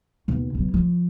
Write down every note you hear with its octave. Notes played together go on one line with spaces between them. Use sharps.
D#2 B2
B2 F#3
F3